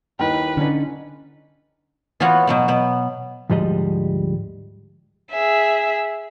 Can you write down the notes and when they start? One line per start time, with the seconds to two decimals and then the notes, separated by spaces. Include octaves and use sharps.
0.19 D#2 D#4 E4 B4 G5
0.57 D3 C#4 D#4 D5
2.20 E3 B3 F4 F#4 C#5 F#5
2.47 B2 F#3 B3
2.68 B2 B3
3.50 D2 G#2 F3 G3 G#3 D#5
5.32 G#4 E5